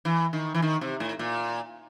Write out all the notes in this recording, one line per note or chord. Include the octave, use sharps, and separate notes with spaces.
E3
D#3
E3
D#3
C3
A2
A#2